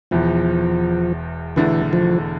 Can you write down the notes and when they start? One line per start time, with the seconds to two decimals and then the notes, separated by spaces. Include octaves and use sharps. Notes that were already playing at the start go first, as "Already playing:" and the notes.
0.11 E1 E2 E3 F3
1.56 E1 E2 D3 E3 A3 E4
1.93 F3